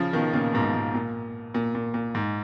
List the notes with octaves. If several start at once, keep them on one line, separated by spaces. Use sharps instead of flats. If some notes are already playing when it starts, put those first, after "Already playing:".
Already playing: C#3 F3
B2 D#3
A#2 C#3
G#2 B2
G#2
A#2
A#2
A#2
A#2
G#2